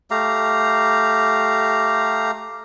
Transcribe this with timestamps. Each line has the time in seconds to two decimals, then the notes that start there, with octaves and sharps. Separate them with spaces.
0.11 A3 G4 F5 A#5